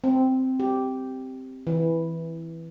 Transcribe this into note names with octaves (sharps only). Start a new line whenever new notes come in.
C4
G4
E3